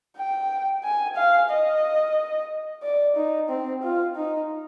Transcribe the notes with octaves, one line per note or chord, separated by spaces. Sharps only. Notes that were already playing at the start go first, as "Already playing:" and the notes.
G5
G#5
F5
D#5
D5
D#4
C4
F4
D#4